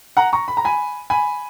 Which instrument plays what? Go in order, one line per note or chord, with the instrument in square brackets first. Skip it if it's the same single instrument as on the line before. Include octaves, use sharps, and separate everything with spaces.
[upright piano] F#5 A#5
A#5 C#6
B5
A#5
G#5 B5
G#5 B5